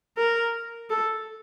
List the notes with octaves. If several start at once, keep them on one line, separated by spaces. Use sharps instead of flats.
A#4
A4